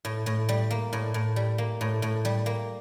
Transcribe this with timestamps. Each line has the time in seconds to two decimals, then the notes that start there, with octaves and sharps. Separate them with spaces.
0.05 A2
0.26 A2
0.49 G3
0.71 A#3
0.93 A2
1.14 A2
1.36 G3
1.58 A#3
1.81 A2
2.02 A2
2.25 G3
2.46 A#3